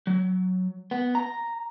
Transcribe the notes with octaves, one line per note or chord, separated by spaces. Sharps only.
F#3
B3
A#5